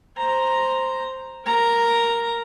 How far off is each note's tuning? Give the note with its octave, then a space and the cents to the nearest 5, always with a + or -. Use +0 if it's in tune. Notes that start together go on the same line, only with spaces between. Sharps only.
C5 +0 A#5 +0
A#4 +0 A#5 +0